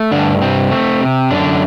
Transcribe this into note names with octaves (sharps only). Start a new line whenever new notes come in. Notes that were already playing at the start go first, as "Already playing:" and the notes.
Already playing: A3
G2 D3 D4
C3 C4
A3
C3
F#2 D3 D4